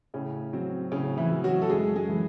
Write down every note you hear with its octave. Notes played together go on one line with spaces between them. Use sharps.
A2 C#3 C#4
F#3 C4
A2 C#3 C#4
E3 E4
F#3
F#3 F#4
A4
F#2 G#3 G#4
G#3 G#4
E3